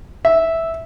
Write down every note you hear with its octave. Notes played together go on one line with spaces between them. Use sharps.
E5